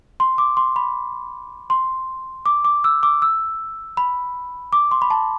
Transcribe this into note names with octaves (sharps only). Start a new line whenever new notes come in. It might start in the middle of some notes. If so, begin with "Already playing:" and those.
C6
D6
C6
B5
C6
D6
D6
E6
D6
E6
B5
D6
C6
B5
A5